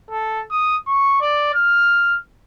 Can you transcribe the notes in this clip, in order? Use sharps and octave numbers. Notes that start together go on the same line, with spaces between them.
A4
D#6
C#6
D5
F6